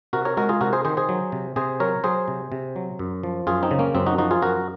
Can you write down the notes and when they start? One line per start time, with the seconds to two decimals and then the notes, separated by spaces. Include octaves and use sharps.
0.13 C3 F#4 A#4
0.25 A#4 C#5
0.37 G#3 F#4 A#4
0.49 F4 G#4
0.61 C3 F#4 A#4
0.73 G#4 C5
0.85 D#3 G#4 C5
0.97 G#4 C5
1.09 F#3
1.32 C3
1.56 C3 G#4 C5
1.80 F#3 A#4 C#5
2.04 F#3 G#4 C5
2.28 C3
2.52 C3
2.76 F#3
2.99 F#2
3.23 F3
3.47 F#2 F4 G#4
3.63 C4 D#4
3.71 C#3
3.79 A#3 C#4
3.95 F#2 C4
4.06 D#4 F#4
4.18 F3 D#4 F#4
4.31 F4 G#4
4.42 F#2 F#4 A#4